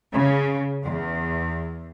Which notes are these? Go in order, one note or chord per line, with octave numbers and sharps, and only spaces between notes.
C#3
E2